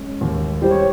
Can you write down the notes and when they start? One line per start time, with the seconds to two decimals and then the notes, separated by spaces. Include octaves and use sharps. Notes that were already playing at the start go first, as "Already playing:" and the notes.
Already playing: G#3 C#4
0.21 D#2
0.62 G3 C5
0.71 C#5